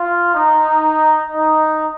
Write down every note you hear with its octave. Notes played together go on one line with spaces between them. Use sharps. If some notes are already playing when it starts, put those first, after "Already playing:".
Already playing: F4
D#4
D#4